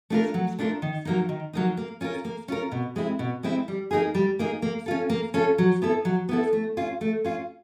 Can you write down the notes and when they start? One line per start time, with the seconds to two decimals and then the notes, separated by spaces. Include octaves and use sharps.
0.10 A3 D4 F4 A#4
0.34 F#3
0.59 A3 D4 F4 A#4
0.82 D#3
1.05 F#3 A#3 D#4
1.29 D#3
1.53 F#3 A#3 D#4
1.77 A#3
2.01 C#4 F4 A#4
2.25 A#3
2.48 C#4 F4 A#4
2.72 B2
2.96 G#3 C4 E4
3.19 B2
3.43 G#3 C4 E4
3.68 G3
3.91 A#3 D#4 G#4
4.15 G3
4.39 A#3 D#4 G#4
4.62 A#3
4.86 C#4 F4 A4
5.10 A#3
5.34 C#4 F4 A4
5.58 F#3
5.82 B3 E4 A4
6.05 F#3
6.29 B3 E4 A4
6.53 A3
6.77 C#4 F4
7.01 A3
7.24 C#4 F4